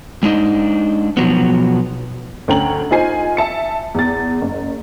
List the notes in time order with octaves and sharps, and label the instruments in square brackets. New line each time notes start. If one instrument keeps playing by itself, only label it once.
[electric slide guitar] G#3 D4 D#4 D#5
B2 F3 F#3 B3
[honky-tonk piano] D2 C#4 G5 A#5 F#7
D#4 F4 C5 G#5 C7
E5 A5 C#7
E2 A6
F#1